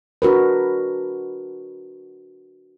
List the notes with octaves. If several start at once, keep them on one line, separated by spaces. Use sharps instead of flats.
D4 F#4 A#4 B4